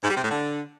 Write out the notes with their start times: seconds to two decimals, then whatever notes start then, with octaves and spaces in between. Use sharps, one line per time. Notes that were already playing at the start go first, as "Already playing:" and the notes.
0.03 G#2
0.10 G3
0.17 C3
0.24 A2
0.31 D3